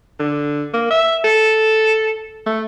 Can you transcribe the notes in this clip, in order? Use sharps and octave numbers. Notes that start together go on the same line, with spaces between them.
D3
A#3
E5
A4
A3